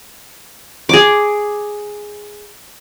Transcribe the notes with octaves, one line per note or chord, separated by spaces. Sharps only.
G#4 D6